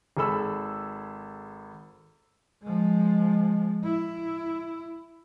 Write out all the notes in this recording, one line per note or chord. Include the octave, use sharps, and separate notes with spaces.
G#1 G#4 A4 B5 E6
F3 G#3
E4